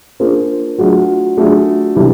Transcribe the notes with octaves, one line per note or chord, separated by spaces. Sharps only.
A#3 D4 F4 G#4 C5
F#3 A3 D4 F4 G#4
F#3 A3 D4 F4 G#4
C3 E3 G3 B3 D4